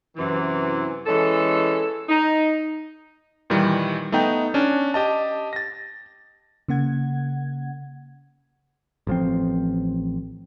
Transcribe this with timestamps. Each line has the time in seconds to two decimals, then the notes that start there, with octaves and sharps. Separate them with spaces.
0.16 F#2 C3 E3
1.06 E3 G#3 C#4 A4
2.09 D#4
3.50 A#2 D#3 E3 G3
4.12 A3 B3 D#4 G5
4.54 C#4 D4
4.94 G4 D#5 A5
5.53 A6 A#6
6.68 C#3 A#3 F#5 G#6
9.07 A1 F3 C4